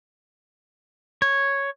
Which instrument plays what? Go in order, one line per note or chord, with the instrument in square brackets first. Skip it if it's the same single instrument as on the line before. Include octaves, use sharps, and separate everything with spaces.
[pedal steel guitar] C#5